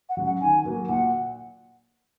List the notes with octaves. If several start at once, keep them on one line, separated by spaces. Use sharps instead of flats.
F#5
F#3 C#4 F#4
F#5
D#3 G#5
F#3 A#3 F#4
A#2 F#5